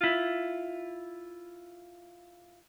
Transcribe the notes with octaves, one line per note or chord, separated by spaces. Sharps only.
E4 F4